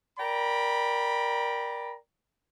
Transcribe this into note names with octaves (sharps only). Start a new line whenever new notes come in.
A#4 D5 G5 A#5 B5